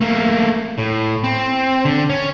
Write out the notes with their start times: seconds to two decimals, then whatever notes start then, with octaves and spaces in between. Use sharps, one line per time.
0.01 A3 A#3
0.78 A2
1.24 C4
1.85 D3
2.09 C#4